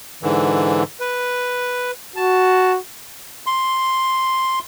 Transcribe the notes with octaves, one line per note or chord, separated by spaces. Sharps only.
G#2 D3 E3
B4
F#4 A5
C6